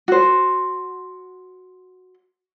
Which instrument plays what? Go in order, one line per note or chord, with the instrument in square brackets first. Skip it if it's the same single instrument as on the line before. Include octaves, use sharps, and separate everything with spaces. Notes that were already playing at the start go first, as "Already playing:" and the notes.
[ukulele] F#4 C5